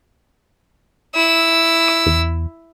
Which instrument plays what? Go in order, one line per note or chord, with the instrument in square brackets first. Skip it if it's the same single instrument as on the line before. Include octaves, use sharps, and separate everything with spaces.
[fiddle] E4 E6
[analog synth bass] E2